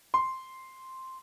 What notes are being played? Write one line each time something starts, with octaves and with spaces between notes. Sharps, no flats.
C6